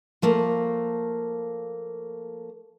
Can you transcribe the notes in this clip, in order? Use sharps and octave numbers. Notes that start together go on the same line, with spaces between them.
F3 A3 A#3